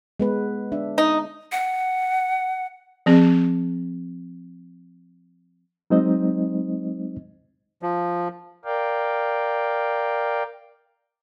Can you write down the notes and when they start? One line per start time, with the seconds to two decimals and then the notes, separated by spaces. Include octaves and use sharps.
0.20 G#3 B3 B4
0.72 D4 E5
0.98 D#4
1.52 F#5
3.06 F3 C4 G#4
5.90 F#3 G#3 C4 D#4 C5 D#5
7.82 F3
8.65 A#4 D5 F5 G5